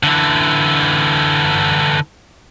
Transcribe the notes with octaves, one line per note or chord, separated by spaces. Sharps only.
D3 E3